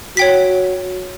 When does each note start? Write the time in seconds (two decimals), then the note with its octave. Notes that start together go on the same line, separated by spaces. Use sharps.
0.17 F#4 C#5 G5 B6